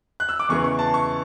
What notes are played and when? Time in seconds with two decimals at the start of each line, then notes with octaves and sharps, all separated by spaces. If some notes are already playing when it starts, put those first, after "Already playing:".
0.20 F#6
0.29 E6
0.40 D6
0.49 E2 C#3 E3 C#6
0.64 C#6
0.79 A5
0.94 C#6